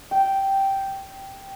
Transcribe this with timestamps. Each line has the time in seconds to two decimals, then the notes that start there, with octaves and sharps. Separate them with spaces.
0.11 G5